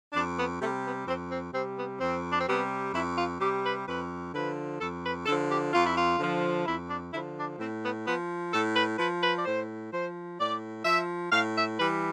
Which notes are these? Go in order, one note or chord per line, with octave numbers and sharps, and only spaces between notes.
F2 D4
B3
C3 G3 A3
B3
F2 C4
C4
C3 G3 C4
B3
F2 C4
D4
C4
C3 G3 B3
F2 E4
F4
C3 G3 G4
B4
F2 B4
D3 F3 B4
F2 A4
B4
D3 F3 A4
G4
F2 F4
E4
F4
D3 F3
F2 E4
D4
D3 F3 E4
D4
A2 C4
B3
F3 B3
A2 A4
B4
F3 B4
B4
D5
A2 C5
F3 C5
A2 D5
F3 E5
A2 F5
E5
E3 G3 B4